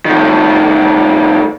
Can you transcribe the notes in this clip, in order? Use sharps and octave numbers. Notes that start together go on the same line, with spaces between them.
A2 D#3